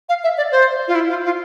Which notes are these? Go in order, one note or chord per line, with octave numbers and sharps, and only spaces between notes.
F5
E5
D5
C5
F4
E4
F4
F4